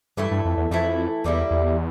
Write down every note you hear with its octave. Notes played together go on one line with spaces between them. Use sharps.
G2 E3 A3 E4 A4
G2
F2
E2
F2 E3 A3 E4 A4
E2 D3 G3 A#3 E4
E2